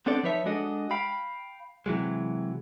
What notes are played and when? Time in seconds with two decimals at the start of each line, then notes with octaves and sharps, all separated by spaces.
0.06 B3 C4 D4 A4 D5
0.23 F3 D#4 B4 C#5 E5
0.46 G#3 D4 F#4 A4 D#5
0.91 F5 G5 B5
1.86 C3 E3 F#3 G#3